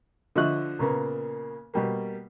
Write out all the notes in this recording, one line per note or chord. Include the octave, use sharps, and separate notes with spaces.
D3 F3 D#5 E5 C#6 F#6
A#2 C#3 A#3 B3
B2 G3 A#3